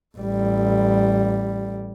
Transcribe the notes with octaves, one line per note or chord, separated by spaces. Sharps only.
A1 G3